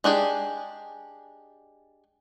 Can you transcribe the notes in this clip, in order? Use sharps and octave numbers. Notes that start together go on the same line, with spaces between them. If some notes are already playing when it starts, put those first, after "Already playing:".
G#3 D4 G4 G#4